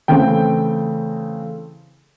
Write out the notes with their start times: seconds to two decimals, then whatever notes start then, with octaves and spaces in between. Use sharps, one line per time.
0.08 C#3 E3 A3 C4 G5